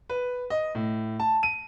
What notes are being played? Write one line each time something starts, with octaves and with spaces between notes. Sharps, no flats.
B4
D#5
A2
A5
D#7